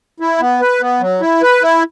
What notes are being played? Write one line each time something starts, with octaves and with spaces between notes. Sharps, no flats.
E4
B3
B4
B3
F#3
E4
B4
E4